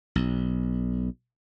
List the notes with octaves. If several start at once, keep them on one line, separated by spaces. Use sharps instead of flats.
B1